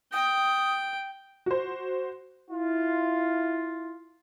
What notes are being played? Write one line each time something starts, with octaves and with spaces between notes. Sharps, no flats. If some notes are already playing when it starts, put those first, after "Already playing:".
G5 D#6
F#4 C5
E4 F4